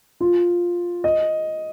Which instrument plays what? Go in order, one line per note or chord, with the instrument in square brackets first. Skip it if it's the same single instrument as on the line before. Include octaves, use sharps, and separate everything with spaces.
[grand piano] F4
D#5